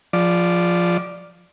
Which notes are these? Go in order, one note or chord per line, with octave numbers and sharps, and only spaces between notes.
F3 D5